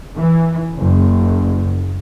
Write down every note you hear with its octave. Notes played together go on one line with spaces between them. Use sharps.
E3
F#1